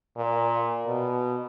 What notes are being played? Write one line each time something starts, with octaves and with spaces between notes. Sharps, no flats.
A#2
B2